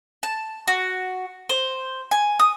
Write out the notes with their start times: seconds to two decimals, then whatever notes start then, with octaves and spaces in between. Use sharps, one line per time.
0.23 A5
0.68 F#4
1.49 C5
2.11 G#5
2.39 D#6